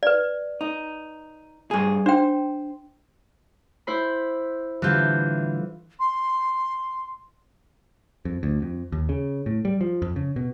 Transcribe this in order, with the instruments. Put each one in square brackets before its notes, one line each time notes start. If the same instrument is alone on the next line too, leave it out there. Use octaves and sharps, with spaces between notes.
[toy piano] B4 D5
[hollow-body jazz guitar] D#4
G2 G#4
[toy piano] D4 G5 [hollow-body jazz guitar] C5
[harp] E4 C5 B5
[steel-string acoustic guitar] A2 D3 G3 [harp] E3 F4 G6
[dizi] C6
[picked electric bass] F2
D2
F2
D#2
C#3
A2
G3
F3
F2
C#3
B2